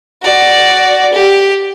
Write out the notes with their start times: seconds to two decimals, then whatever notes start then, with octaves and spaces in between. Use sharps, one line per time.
0.22 F#4 D5
1.13 G4